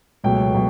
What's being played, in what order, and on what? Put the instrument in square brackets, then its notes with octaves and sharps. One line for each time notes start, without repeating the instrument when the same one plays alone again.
[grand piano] C#2 B2 F#3 A3 G5
B2 F#3